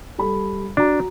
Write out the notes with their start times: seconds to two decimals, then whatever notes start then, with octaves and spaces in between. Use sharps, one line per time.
0.18 G3 A4 B5
0.77 D4 F#4 A#5